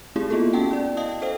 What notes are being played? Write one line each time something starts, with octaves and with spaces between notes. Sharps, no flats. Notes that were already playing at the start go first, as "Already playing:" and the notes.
A3 C4 E4 G4 G#4
A#3 B3 F4 G#4 A4
C#4 F#4 F#5 G5 A5
E4 D5
D#5 F5 G5 A5 D#6
A4 C5 D#5 F5 G5